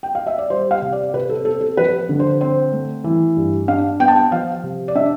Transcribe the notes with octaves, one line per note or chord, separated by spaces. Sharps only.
G5
F5
E5
D5
G3 C5
F5
C3
D5
C3 B4
A4
C4 A4
A4
F3 B4
D3
C5
C4 C5
A3
E3
G2
D4 F5
B3 G5
A5
G5
F3 F5
C3
D5
D4 E5